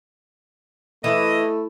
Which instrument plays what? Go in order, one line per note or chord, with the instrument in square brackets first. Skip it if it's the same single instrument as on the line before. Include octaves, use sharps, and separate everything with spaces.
[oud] E3 [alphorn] A3 [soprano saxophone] D#5